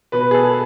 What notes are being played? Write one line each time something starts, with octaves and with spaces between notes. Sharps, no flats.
B2 B4
G#4
A4